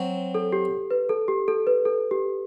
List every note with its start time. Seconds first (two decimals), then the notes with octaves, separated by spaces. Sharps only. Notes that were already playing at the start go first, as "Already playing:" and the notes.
Already playing: F#3 C4
0.34 A4
0.53 G4
0.91 B4
1.09 A4
1.28 G4
1.48 A4
1.67 B4
1.85 A4
2.11 G4